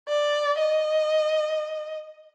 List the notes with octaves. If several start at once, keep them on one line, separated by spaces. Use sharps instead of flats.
D5
D#5